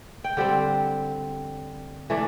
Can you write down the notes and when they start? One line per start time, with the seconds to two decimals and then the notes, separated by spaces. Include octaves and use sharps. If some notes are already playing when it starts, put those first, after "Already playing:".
0.24 G5
0.37 D3 G3 C4 F#5
2.10 E3 A3 D4